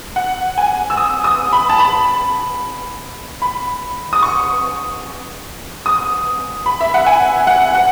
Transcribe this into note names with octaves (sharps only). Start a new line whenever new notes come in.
F#5
G#5
E6
D#6
D#6
B5
A5
B5
B5
D#6
C#6
D#6
B5
E5
F#5
G#5
F#5
F#5